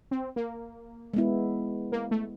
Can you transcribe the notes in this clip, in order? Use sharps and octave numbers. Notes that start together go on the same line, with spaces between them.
C4
A#3
G#3 B3 E4
A#3
A3